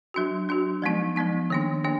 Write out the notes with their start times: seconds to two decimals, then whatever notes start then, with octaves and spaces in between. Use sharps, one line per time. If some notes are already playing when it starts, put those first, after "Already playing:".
0.14 F#3 D4 F#4
0.49 F#3 D4 F#4
0.82 F3 G#3 B3 D#4
1.16 F3 G#3 B3 D#4
1.50 D#3 A#3 D4
1.84 D#3 A#3 D4